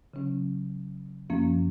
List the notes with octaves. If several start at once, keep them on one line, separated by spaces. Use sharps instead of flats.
C#3 F#3 C#4
F#2 F3 A#3 C#4